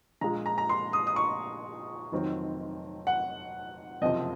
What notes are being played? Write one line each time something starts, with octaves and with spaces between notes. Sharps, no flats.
A#1 A#2 G#3 A#5
A#5
A#5
C6
D#6
D#6
C#6
F1 F2 D#3 F#3 C4
F#5
F#1 F2 C3 F3 C4 D#5